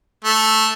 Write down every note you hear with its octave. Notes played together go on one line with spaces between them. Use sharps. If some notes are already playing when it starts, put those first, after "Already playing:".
A3